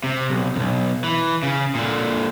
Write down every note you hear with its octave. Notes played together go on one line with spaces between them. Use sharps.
C3
B1
B1 F#2
E3
C#3
A#2 D3